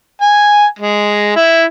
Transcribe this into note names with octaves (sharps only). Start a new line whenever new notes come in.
G#5
G#3
E4